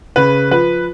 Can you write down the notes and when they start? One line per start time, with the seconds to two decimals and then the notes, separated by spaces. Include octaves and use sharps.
0.16 C#3 B4
0.51 F3 B4